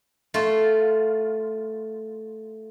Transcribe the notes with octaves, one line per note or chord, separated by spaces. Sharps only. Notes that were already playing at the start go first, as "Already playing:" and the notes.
A3 F4